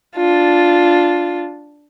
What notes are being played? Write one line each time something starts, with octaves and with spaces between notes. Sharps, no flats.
D4 F4